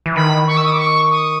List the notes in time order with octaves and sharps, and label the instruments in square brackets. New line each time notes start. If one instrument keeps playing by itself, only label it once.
[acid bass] E3
[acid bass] D#3 [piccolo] B5
[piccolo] C#6
E6
D#6
D6
C#6
D#6